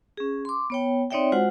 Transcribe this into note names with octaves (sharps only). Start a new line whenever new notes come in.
C#4 G#4
C6 D6
B3 C#5 G5
C4 D#4 C#5 D5 E5 G5
G#3 F4 F#4 C5 F#5